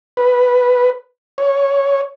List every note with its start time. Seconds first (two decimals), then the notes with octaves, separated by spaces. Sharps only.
0.17 B4
1.38 C#5